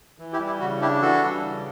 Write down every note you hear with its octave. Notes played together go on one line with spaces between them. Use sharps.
E3
E4 G4
G3
E4
C#3 F#4
D4 E4 G4
E3 F#4 A4
G3
C#3